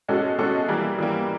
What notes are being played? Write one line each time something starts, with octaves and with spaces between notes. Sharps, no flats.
B2 G#3 C#4 F#4 A4
B2 G#3 C#4 F#4 A4
E3 G3 A#3
E3 G3 A#3